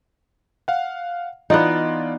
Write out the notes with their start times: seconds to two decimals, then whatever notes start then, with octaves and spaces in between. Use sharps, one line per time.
0.68 F5 F#5
1.50 E3 B3 D#4 F4 D5